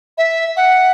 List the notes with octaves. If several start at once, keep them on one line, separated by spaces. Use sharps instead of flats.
E5
F#5